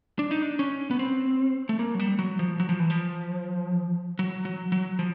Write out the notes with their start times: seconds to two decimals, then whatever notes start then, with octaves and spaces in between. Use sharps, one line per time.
0.19 D4
0.31 D#4
0.42 D4
0.59 C#4
0.91 B3
0.99 C4
1.69 A3
1.79 A#3
1.95 F#3
2.00 G3
2.19 F#3
2.39 F3
2.60 F#3
2.69 F3
2.79 E3
2.90 F3
4.19 F#3
4.45 F#3
4.72 F#3
4.99 F3